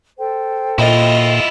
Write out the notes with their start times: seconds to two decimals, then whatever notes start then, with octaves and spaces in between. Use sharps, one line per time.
0.18 A4 C5 G5
0.78 A#2 E4 F4 D#5